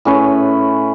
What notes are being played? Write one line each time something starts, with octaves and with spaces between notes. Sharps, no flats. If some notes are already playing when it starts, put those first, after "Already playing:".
A2 C#4 B4